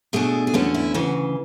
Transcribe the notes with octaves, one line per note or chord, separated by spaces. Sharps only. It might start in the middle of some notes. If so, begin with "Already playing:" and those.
B2 A3 D4 G#4
G#4
E2 D3 A3 C#4 F#4
E4
D2 C#3 E3 F#4